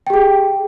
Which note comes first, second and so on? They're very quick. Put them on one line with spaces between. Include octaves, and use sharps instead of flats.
G5 G4 G#4